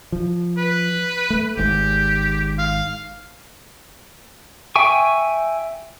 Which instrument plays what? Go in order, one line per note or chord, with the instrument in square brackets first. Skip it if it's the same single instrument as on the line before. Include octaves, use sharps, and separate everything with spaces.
[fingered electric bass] F3
[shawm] B4
[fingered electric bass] A3
[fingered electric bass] G#1 G#2 [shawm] G4
[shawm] F5
[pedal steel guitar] E5 G5 G#5 C#6